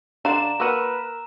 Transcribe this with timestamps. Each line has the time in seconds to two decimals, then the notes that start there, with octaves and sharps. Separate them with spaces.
0.25 D3 D4 D5 F5 A#5 E7
0.60 A#3 F#4 A#4 B4 E6 D#7